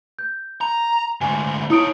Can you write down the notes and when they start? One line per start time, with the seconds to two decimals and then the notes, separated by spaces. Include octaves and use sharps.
0.19 G6
0.61 A#5
1.21 D2 G#2 G#5
1.70 D#4 E4 C#5 D#6 D7